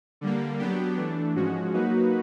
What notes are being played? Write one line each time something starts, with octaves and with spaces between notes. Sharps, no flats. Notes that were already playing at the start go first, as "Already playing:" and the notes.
D3 G3 A#3
F#3 B3 D4 G4
E3 A3 D4
G#2 F3 G#3 C#4 F#4
F#3 A#3 D#4 F#4 B4